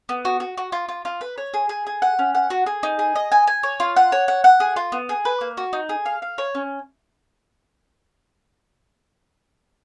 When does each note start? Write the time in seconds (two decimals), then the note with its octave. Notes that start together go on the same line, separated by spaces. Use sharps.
0.09 B3
0.25 F#4
0.40 F#4
0.57 F#4
0.72 F4
0.89 F4
1.05 F4
1.21 B4
1.38 C#5
1.54 G#4
1.69 G#4
1.87 G#4
2.02 F#5
2.19 C#4
2.35 F#5
2.50 F#4
2.66 G#4
2.83 D#4
2.99 G#4
3.15 D#5
3.32 G#5
3.47 G#5
3.63 C#5
3.80 F4
3.96 F#5
4.12 C#5
4.28 F#5
4.44 F#5
4.60 G#4
4.76 F4
4.92 B3
5.09 G#4
5.25 B4
5.41 A#3
5.57 F#4
5.73 D#4
5.89 G#4
6.06 F5
6.22 F5
6.38 C#5
6.55 C#4